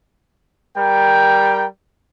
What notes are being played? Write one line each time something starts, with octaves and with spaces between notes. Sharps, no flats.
G3 A#4 G5